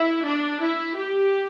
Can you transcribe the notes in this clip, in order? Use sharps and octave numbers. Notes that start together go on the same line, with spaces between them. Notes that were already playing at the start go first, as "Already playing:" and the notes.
Already playing: E4
D4
E4
G4